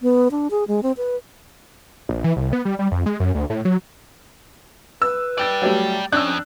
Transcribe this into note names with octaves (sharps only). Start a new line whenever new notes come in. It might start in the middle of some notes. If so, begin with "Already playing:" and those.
B3
D4
G#4
G#3
C4
B4
A#1
E3
C2
B3
G3
G3
F2
G#3
F#2
D2
A2
F#3
B4 E6
D5 G5 A6 D7
F#3 G3 A3
F2 C#4 D4 E6 F#6